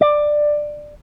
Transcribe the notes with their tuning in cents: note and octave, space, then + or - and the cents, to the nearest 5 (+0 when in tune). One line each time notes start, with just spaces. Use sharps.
D5 +15